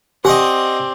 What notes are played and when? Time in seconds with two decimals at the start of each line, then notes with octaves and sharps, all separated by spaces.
0.25 C4 G4 D5 D#5 F#5 G#5